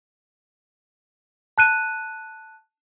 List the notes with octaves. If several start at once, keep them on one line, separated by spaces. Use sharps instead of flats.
A5 F#6 D#7